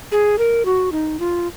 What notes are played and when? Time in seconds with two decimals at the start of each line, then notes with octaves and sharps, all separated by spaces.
0.12 G#4
0.38 A#4
0.65 F#4
0.92 D#4
1.20 F4